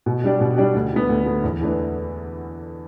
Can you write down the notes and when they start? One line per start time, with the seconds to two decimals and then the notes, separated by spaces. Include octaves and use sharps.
0.06 B2
0.24 G3 D4 G4 D5
0.40 B2
0.58 G3 D4 G4 D5
0.75 D2
0.92 D3 B3
1.09 D2
1.26 D3 B3
1.43 E2
1.61 E3 A3 D4 B4